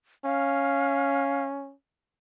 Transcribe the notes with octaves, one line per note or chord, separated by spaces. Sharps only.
C#4 F5